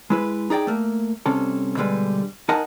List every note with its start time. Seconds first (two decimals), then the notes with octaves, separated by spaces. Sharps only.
0.10 G#3 E4 B4
0.50 D#4 G#4 D5 G5
0.67 A3 A#3
1.26 C2 C3 C#4 A4
1.77 B2 D3 G3 G#3 B4
2.49 D#4 A#4 D#5 F#5 G#5 A5